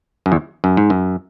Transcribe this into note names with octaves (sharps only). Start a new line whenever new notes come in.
F#2
E2
F#2
G#2
F#2